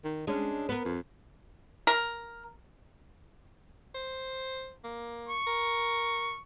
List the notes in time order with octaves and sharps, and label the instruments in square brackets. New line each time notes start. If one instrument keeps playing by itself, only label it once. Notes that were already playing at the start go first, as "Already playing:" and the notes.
[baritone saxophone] D#3
[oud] G#3 C#4 [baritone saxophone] D4
[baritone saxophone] B3 [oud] A#4 B4
[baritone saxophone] F2
[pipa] A#4
[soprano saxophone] C5
A#3
[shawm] C#6
[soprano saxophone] A#4